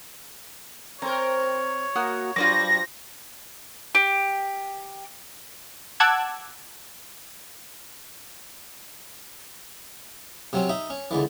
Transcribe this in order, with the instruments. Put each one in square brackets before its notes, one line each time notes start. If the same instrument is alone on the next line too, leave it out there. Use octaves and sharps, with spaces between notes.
[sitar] C4 A#4 [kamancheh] C#5 [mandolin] A#5
[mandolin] A#3 F#4 D#6
[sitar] G2 F#3 [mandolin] F4 C5 D6 [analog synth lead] A#6
[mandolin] G4
[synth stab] F#5 A5 D6 E6 F#6 G#6
[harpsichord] C3 F#3 C4 C#4
D#4 E5
C#4
C#2 D3 E3